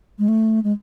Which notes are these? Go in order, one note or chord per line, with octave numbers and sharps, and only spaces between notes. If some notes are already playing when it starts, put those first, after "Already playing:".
G#3
A3
G#3